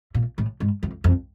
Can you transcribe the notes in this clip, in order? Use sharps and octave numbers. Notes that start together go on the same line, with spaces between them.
A#2
A2
G#2
F2
F2